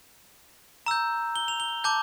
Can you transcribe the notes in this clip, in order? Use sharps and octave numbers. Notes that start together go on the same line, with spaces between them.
A#5 E6 G6
G7
F7
G7
A5 D6 G6